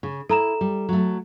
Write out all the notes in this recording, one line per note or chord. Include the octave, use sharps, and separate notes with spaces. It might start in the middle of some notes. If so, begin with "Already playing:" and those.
C#3
E4 A4 A#5 E7
G3
F#3 A3